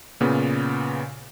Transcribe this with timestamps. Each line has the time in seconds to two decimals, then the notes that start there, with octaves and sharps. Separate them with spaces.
0.21 A#2 C#3 B3